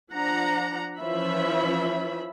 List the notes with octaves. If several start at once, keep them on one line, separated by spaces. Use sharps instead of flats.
F3 D4 F#5 A#5
E3 F3 C#4 F4 E5 B5